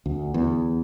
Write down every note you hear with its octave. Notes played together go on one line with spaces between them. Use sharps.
D2
E2